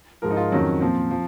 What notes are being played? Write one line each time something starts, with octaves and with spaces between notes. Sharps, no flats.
G#2 F3 A#4
D#4
F4
F2 D#3 F#3 C#4
A#2 F3 C4
F3